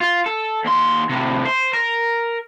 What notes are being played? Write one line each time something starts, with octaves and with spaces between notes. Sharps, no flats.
F4
A4
D#2 C6
A2 C3
C5
A#4